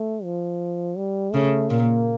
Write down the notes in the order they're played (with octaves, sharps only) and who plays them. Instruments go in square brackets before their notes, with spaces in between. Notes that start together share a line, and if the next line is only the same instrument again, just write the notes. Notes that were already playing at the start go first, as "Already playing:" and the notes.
Already playing: [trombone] A3
F3
G3
[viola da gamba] C#3 [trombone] A3
[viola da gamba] A#2 [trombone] A#3